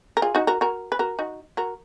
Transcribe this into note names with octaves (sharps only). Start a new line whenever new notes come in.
A#4
F4 G#4
D#4 F#4
F#4 A#4
F#4 A#4
B4
F#4 A#4
D#4 F#4
F#4 A#4